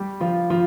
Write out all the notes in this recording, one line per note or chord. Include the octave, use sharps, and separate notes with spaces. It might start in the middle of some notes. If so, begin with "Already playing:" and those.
Already playing: G3 G4
F3 F4
F3 F4